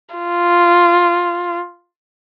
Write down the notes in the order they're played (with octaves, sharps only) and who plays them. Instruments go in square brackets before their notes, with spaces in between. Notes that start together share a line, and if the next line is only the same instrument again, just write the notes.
[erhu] F4